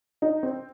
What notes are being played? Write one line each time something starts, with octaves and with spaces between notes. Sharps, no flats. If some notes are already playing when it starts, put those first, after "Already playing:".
D#4
C4